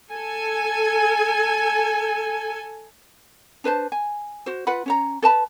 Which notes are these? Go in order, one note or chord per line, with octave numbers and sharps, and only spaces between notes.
A4 G#5
D4 B4 C5 A5
G#5
F#4 C5
F4 B4 F#5 B5
C#4 C#5 A#5
A4 B4 A5 B5